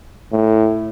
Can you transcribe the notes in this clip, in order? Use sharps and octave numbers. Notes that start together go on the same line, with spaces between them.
A2